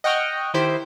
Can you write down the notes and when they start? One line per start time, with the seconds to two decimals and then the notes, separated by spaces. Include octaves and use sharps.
0.04 D#5 F#5 G5 C#6 F6
0.54 D#3 E4 G4 C5